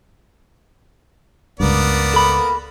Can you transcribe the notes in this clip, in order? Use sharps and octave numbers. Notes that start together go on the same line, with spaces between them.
C#2 G2 A#3 B3 D5
A4 B5